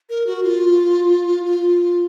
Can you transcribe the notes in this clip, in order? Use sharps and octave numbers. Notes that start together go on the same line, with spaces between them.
A#4
F#4
F4
F4